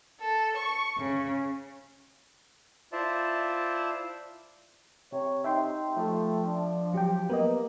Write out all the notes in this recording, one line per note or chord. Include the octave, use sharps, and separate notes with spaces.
A4
C#6
C#3
E4 F4 C5 D5 E5 A5
C3 C#5
D#4 E5 G5 C6
F3 A3
D4
F#3 G4 G5
A#3 B3 D#5